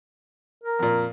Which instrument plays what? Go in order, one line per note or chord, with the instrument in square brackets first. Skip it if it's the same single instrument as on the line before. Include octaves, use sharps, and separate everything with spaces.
[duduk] A#4
[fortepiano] F2 A#2